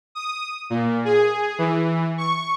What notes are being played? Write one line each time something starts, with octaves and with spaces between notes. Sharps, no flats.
D#6
A#2
G#4
E3
C#6